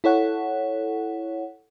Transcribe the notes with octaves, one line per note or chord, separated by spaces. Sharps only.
E4 A4 C#5 F#5